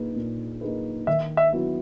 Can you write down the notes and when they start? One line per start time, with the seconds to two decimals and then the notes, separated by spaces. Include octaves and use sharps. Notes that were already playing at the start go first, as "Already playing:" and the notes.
Already playing: A#2 A#3 D#4 G#4 B4
0.16 A#2
0.61 A#3 D#4 G#4 B4
1.07 D#3 E5
1.37 E5
1.53 F#3 B3 E4